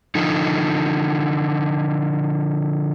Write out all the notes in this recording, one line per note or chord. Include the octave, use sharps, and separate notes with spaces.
D3 F3 D#4